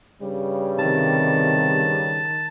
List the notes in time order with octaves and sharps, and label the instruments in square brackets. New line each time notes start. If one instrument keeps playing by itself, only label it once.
[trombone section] G2 C#3 G3
[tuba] C3 [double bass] D#3 [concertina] A5